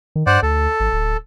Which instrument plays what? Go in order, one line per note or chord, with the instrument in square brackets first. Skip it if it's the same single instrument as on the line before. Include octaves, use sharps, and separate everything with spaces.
[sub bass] D#3
[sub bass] G2 [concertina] C5 D5 F#5
[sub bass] D2 [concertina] A4
[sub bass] G#1
D1